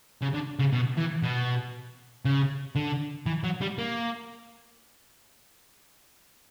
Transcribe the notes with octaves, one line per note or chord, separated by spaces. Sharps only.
C#3
D3
C#3
B2
E3
B2
C#3
D3
E3
F#3
G3
A#3